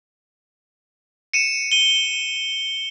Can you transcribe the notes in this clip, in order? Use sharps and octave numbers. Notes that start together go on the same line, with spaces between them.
C#7 D#7 E7
D#7 G7